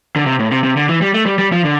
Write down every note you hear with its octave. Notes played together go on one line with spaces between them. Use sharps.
D3
C3
A2
C3
C3
D3
E3
G3
A3
G3
G3
F3
D3